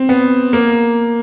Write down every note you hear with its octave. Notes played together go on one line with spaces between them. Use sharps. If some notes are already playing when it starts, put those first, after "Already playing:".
Already playing: C4
B3
A#3